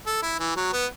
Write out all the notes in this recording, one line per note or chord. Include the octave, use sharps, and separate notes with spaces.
A4
E4
E3
F#3
B3